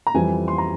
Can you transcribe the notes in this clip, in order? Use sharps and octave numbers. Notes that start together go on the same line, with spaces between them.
A#5
F2 E3 G3 G#5
C6
A#5